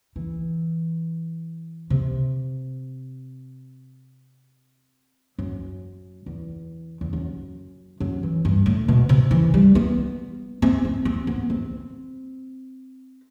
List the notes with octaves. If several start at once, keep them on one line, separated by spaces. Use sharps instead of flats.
E3
C3
F#2
E2
E2
F#2
F#2
E3
G2
A2
B2
C3
E3
G3
B3
C4
C4
C4
B3
C4